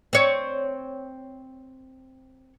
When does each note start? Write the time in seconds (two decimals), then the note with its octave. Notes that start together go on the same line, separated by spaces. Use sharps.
0.13 C4 C#5